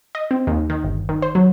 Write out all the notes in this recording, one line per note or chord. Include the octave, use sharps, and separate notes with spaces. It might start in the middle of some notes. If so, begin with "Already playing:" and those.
D#5
C4
D#2
D#3
G1
D#3
C5
F#3